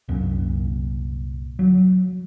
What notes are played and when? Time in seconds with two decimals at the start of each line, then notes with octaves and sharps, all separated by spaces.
0.08 C2 F#2 A#2
1.59 F#3